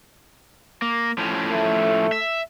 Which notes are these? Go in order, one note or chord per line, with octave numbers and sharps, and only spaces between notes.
A#3
A2 F3 C#4
A3
E5